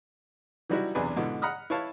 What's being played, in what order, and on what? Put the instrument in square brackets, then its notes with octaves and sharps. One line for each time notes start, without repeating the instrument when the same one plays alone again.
[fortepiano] E3 F#3 G3 D#4 E4 F#4
B1 E2 C3 D4 G#4 B4
G#2 B2 D3 E3
F#5 A#5 B5 D#6 F6
E4 B4 C#5 F5 A5